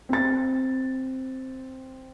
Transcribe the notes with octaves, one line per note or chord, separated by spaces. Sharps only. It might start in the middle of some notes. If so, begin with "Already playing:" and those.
C4 A6